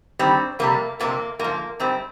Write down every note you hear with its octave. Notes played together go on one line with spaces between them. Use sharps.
G2 D#3 G3 C4
F2 C3 G3 A#3
F2 C3 F3 A#3
G#2 F3 A#3
G#2 G3 C4